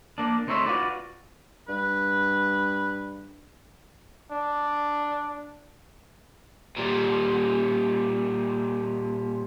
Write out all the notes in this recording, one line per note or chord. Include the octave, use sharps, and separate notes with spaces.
A#3 D4
D2 C4 D#4 C#5 E5 C6
F4 F#4 B4 D5
G2 B4
D4
A#2 G3